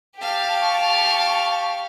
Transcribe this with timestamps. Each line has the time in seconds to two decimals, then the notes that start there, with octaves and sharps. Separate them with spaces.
0.17 G4 F5 G5 A5
0.59 A5 C#6